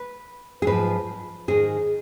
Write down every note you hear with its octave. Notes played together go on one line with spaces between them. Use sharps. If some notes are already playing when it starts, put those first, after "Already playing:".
Already playing: B4
G#4
G#2 F3 B4
G#2 D#3 G#4